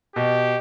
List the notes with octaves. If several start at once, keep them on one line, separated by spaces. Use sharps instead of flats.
B2 G4